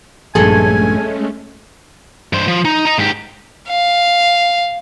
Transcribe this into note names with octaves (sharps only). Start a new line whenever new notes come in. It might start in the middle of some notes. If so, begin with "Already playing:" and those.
A#1 G2 G#3 A3 C#4 G#4 A4 G#5
G2 C5
F3
D#4
D#5 A#5
G#2 G4
F5